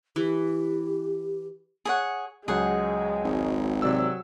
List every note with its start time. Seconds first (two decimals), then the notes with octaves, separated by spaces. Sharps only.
0.16 E3 G4
1.85 G#4 C#5 F#5
2.48 C#2 F#3 G#3 G#4 C5 F#5
3.24 G#1
3.82 C3 F#3 D5 E6